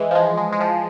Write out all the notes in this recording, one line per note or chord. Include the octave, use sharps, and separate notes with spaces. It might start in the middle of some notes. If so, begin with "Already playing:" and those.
Already playing: E3 G#3
F3
G#3
G#3
G#3
F3